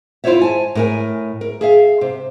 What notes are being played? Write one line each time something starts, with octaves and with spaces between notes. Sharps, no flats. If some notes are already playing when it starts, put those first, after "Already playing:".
E4 F4 G#4 C5 C#5 E5
G#5 A5
A2 A#4 G#5
A#4
G#4 E5 F5
C3